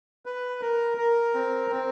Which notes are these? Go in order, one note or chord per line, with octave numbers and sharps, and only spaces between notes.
B4
A#4
A#4
C4
C4